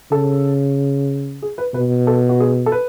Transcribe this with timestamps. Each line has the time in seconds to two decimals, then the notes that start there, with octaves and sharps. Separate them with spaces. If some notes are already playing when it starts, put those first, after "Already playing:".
0.11 C#3 A4
1.42 G#4
1.58 B4
1.74 B2 B4
2.07 A4
2.29 F#4
2.40 G#4
2.66 A4
2.72 B4